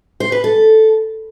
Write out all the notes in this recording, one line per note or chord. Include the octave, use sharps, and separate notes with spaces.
C5
B4
A4